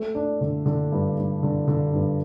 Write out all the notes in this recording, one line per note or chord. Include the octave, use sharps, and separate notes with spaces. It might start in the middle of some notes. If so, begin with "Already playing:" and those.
Already playing: A3
D4
D3
D3
G2
G2
D3
D3
G2